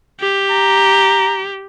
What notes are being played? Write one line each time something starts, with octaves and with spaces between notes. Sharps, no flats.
G4
A#5